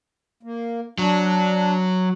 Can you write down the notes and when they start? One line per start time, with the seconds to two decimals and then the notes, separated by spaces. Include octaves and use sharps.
0.43 A#3
0.99 F#3 D4